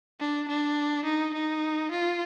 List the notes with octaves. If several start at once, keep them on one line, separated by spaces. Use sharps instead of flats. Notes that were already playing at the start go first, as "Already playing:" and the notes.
D4
D4
D#4
D#4
F4